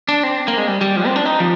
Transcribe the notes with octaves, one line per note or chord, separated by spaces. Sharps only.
D4
C4
A#3
G#3
G3
G3
F3
C4
D4
D#4
F3